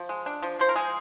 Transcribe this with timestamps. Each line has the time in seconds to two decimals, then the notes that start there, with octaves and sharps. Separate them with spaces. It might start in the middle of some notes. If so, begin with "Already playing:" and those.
Already playing: F3
0.09 G#3
0.26 D4
0.42 F3
0.59 F3 C5
0.69 A#4
0.76 G#3 G#4